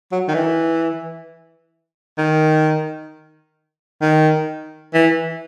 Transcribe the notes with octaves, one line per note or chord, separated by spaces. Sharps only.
F#3
D#3
E3
D#3
D#3
E3